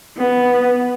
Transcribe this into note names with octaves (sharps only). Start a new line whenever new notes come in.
B3